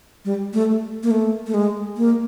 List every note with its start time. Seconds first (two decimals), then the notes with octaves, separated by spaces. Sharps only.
0.25 G3
0.54 A3
1.03 A#3
1.11 A3
1.47 A3
1.54 G#3
1.97 A#3